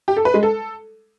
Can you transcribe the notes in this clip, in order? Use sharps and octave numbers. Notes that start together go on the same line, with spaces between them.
G4
A4
B4
G#3
A4